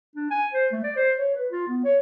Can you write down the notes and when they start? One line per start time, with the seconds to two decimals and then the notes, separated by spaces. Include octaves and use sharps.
0.16 D4
0.31 G#5
0.53 C5
0.72 A3
0.84 D5
0.96 C5
1.17 C#5
1.35 B4
1.50 F4
1.68 B3
1.84 C#5